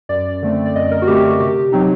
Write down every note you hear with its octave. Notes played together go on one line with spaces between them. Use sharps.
F#2 D5
D3 A3 C4
D5
F#2 D#5
A#4
F#4
D3 A3 C4 G4
F#4
C3 G4
F#3 C4 D#4